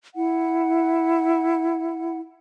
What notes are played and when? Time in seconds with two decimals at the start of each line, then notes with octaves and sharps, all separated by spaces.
0.14 E4 F#5